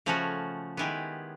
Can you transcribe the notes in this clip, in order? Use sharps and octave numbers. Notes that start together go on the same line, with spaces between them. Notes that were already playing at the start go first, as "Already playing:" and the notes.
C#3 F3 A3 C#4 F#4
D#3 G#3 B3 E4 G4